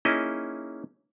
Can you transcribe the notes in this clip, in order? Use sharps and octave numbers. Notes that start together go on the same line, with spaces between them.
A#3 C#4 D#4 E4 G#4 D#5